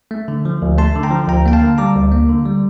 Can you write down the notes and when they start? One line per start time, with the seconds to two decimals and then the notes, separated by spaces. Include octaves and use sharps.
0.11 A3
0.28 D3
0.45 F3
0.62 D2
0.78 A3 A5 C6
0.95 D3
1.03 G5 A#5
1.11 F3
1.28 D2 G5 A#5
1.46 A#3 G5
1.53 F5 A5
1.61 D3
1.78 G3 A#5 D6
1.95 D2
2.12 A#3
2.29 D3
2.45 G3